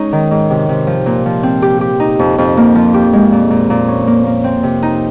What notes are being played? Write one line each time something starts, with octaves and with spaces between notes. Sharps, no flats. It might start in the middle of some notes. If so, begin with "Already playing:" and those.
Already playing: G#3 C#4 D#4
D#3
G#2
C3
C3
F3
A#2
F3
C4
G4
G4
D#4
F2
F2
A#3
F3
G4
G#3
A#2
A#2
A#2
C#4
A#3
A#3
C4
C3
D#4